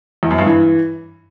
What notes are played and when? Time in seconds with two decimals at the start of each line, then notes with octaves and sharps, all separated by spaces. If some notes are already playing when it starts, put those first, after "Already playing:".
0.23 E2
0.31 F#2
0.38 G2
0.46 E3